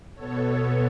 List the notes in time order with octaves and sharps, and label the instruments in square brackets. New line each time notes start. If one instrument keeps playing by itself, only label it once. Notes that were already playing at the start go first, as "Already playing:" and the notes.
[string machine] B2 B3 A4 C#5